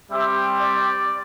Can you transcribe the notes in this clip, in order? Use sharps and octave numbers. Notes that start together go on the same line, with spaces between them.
G3 C4 G4 E5
D5